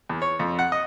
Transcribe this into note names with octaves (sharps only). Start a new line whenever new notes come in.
E2
C#5
F2
F#5
D#5